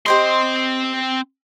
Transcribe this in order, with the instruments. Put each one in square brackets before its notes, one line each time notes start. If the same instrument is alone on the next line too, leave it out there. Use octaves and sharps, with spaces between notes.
[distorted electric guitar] C4 C6 [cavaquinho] G4 C5 D#5